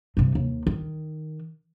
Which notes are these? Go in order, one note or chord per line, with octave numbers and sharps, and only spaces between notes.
G2 C3
D#2
D#3